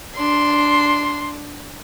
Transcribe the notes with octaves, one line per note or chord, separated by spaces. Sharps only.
D4 C6